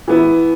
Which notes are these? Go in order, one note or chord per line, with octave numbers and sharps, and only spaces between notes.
E3 B3 E4